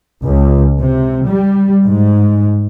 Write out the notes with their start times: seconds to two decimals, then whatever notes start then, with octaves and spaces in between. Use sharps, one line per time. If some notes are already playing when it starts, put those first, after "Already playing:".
0.24 C#2
0.80 C3
1.27 G3
1.83 G#2